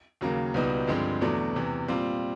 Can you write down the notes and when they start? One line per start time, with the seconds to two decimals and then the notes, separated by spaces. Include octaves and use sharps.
0.21 D#2 C#3 F#3 A#3
0.54 C#2 B2 G3 B3 D#4
0.87 G2 D3 F3 G#3 C4
1.21 E2 B2 F#3 A3 D4
1.56 E2 C3 E3
1.88 A#2 G3 C4 F4